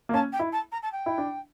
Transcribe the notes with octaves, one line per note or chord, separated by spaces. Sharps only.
A#3
C#4 A5
G5
E4
A5
A#5
A5
G5
E4
D4